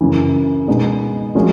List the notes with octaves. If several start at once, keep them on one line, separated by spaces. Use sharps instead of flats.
F#2 C#3 E3
B2 G#3 B3 D#4
F3 G#3 C#4 F#4 A#4